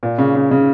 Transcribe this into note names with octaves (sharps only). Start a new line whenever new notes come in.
A#2
C#3
C#3
C#3